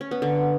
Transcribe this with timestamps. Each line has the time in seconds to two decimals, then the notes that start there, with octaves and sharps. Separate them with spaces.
0.01 C#4
0.11 B3
0.22 D3